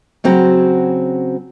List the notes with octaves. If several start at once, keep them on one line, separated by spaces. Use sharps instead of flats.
C#3 F#3 C4 F#4